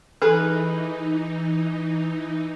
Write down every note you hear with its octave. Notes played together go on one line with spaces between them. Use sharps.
E3 D#4 G#4 A4 B4